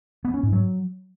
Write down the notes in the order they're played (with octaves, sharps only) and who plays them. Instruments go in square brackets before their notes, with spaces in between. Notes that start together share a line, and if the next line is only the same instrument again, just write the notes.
[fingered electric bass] B3
C#4
G#2
F#3